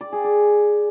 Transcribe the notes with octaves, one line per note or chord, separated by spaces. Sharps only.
D5
G#4
D5